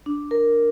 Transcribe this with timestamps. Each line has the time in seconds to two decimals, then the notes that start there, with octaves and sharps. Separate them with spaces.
0.06 D4
0.31 A#4